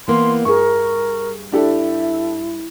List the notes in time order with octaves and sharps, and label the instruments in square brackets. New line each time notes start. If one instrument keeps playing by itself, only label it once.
[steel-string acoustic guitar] E3 A#3 B3 [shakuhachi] C6
[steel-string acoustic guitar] G2 [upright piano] G#4 C#6 [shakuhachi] A#4
[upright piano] D4 G4 A4 [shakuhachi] E4